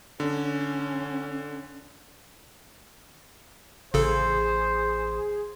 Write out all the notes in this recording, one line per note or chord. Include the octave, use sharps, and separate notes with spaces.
D3 C#4
A1 C#3 G#4 A4 C5